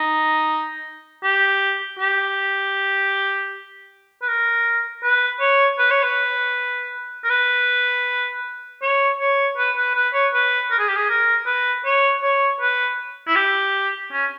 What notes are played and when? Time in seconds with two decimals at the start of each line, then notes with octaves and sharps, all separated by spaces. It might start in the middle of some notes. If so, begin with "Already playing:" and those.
Already playing: D#4
1.23 G4
1.99 G4
4.22 B4
4.28 A#4
5.03 B4
5.40 C#5
5.79 B4
5.91 C#5
6.03 B4
7.24 A#4
7.30 B4
8.82 C#5
9.20 C#5
9.58 B4
9.77 B4
9.95 B4
10.14 C#5
10.34 B4
10.71 A#4
10.79 G#4
10.88 G4
10.96 G#4
11.09 A#4
11.46 B4
11.85 C#5
12.23 C#5
12.61 B4
13.27 E4
13.36 G4
14.12 C#4